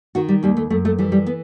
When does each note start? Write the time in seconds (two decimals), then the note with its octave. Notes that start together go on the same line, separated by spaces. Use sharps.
0.15 D#3 F#4
0.29 G3
0.43 D#2 G3
0.57 A3
0.70 F#2 A3
0.85 A3
0.99 E3 G3
1.12 G3
1.27 B3